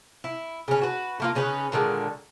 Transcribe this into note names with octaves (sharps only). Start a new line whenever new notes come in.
E4
C#3 C#4
F#4 B4
A3 A#3 F4
C#3 C#4 D#4 B4
A#2 D3 D#3 G#3